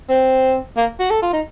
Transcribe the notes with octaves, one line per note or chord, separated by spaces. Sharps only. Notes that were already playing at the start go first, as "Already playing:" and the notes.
C4
A#3
F#4
A4
F4
D#4